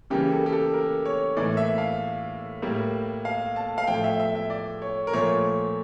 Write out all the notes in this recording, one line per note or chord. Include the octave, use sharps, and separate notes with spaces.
C#3 E3 G3 A#3 G4
A4
G4
A4
A#4
C#5
A2 E3 A#3 D5
E5
F5
A2 G3 A#3
F5
A5
F5
A2 F3 A3 G5
E5
E5
E5
D5
C#5
A#4
A#2 F3 A3 C#5